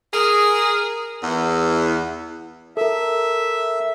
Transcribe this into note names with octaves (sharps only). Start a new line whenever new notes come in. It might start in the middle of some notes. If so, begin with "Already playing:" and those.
G#4 A#4
E2
A4 A#4 E5